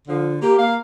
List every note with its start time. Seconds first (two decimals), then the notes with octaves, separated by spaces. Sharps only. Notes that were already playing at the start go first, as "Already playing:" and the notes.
0.08 D3 F3
0.41 A#3 G4
0.58 A#3 F5